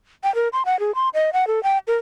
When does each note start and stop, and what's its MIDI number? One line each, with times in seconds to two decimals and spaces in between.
0.24 0.33 79
0.35 0.48 70
0.53 0.63 84
0.66 0.79 78
0.80 0.94 68
0.95 1.09 84
1.14 1.30 75
1.33 1.47 78
1.47 1.62 69
1.63 1.78 79
1.88 1.95 70